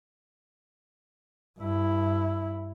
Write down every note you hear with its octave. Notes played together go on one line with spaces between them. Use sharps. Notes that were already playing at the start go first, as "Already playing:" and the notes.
G2 E4